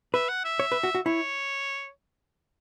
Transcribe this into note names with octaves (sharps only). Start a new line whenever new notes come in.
B4 E5
F#5
E5
C#5
B4
F#4
F#4
E4 C#5